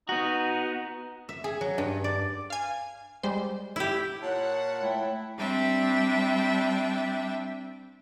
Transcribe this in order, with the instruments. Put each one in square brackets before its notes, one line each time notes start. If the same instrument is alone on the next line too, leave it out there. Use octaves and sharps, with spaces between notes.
[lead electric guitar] B3 F#4 [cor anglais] D#4
[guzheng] E5
G#4
F#3
G2
D5
[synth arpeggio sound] F5 G#5
G3 G#3 C5
[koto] E4 G4
[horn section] A#2 F#5 [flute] C#5 [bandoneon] A5
[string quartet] A3 E4 G5
G3 C4 D4 E5 G5